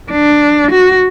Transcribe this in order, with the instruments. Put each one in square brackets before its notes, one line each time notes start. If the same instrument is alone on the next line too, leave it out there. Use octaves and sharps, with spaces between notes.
[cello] D4
F#4